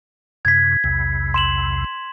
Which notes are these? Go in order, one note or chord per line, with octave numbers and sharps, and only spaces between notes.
F#2 C3 G#6 B6
B1 E2 C3
C6 E7 F#7